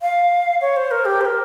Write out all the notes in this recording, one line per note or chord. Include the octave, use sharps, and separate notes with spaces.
F5
C#5
C5
A#4
G4
C5
A#4